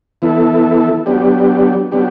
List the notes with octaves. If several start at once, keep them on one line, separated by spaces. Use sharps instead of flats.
E3 B3 E4 A4
F#3 B3 D4 G4
F#3 B3 D4 G4